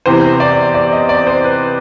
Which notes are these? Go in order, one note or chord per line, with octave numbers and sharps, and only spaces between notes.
E2 C3 E3 C5
D5
D5
D#5
D5
C5
B4